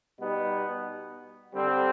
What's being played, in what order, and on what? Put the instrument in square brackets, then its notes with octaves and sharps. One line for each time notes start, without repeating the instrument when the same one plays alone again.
[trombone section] B2 G3 B3 D#4
D3 G3 C4